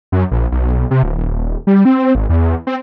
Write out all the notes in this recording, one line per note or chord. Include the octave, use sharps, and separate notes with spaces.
F#2
A#1
B1
C3
D1
D#1
G3
C4
G#1
E2
C4